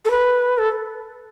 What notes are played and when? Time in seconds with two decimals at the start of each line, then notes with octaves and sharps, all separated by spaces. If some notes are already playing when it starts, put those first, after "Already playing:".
0.05 A4
0.11 B4
0.58 A4